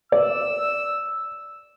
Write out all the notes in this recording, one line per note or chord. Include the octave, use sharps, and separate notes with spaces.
D5 E6